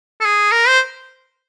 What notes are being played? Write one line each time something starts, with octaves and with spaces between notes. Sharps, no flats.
A4
G#4
A#4
C5